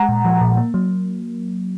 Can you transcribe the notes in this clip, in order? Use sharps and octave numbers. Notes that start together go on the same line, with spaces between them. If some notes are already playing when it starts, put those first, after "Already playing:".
Already playing: G#3 F#5 A#5
A#2
F3
A#2
A#3
F#3